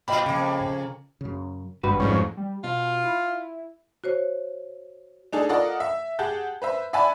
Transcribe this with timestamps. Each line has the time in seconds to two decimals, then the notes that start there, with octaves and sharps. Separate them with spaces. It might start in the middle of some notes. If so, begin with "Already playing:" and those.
0.08 A#2 F4 D#5 G5 B5
0.26 F2 C#3 A#3
1.21 F#2 C#3
1.83 G#1 G2 F#4 B4
2.00 F2 G#2 G3 C#4
2.37 G3
2.64 B2 F4
3.04 E4
4.04 F#4 C5 C#5
5.33 D4 D#4 G#4 A4
5.49 F4 A4 A#4 D5 D#5 F#5
5.80 E5
6.19 G4 G#4 F#5 A5 G6
6.62 B4 C5 E5
6.93 D5 E5 F#5 G#5 A5 B5